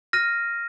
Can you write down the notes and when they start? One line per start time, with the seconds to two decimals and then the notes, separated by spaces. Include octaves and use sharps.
0.13 F6 A#6 D#7